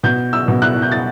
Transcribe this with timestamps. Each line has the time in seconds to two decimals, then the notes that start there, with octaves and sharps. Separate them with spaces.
0.03 B2 G6
0.33 E6
0.48 B2
0.62 F#6
0.82 G6
0.92 A6